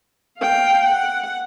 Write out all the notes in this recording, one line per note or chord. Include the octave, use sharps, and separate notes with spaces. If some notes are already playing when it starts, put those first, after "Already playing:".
F5 G5
F#5